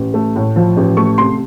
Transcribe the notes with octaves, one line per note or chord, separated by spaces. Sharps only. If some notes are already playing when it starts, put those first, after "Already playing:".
Already playing: A1
A3
A2
F3
A1
A3 C#6
C3 C6